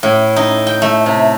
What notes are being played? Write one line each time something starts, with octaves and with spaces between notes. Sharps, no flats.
A2
D#4
G5
A3
C3